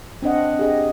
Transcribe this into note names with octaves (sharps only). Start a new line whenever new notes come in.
C4 D4 D#5 F#5
G4 G#4 D#5